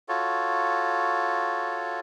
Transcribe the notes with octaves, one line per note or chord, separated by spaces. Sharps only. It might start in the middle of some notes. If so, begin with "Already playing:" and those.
F4 F#4 A4 C#5